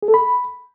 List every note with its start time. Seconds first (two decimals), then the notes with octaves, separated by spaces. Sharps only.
0.03 G#4
0.08 A4
0.14 B5